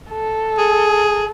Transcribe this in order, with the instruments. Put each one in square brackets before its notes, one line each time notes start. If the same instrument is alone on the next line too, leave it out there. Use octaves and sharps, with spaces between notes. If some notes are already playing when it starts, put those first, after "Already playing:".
[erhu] A4
[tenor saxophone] G#4